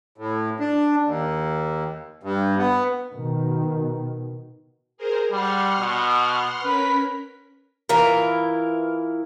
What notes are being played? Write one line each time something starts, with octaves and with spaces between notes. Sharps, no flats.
A2
D4
D#2
G2
B3
B2 D#3
G#4 A#4 C5
G3 F#5 C6 F6
B2
C#4 A#4 B4 B6
E3 E4 F4 A#4